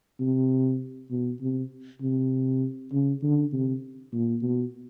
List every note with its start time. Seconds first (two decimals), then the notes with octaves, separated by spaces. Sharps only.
0.20 C3
1.11 B2
1.42 C3
2.02 C3
2.92 C#3
3.23 D3
3.53 C3
4.13 A#2
4.43 B2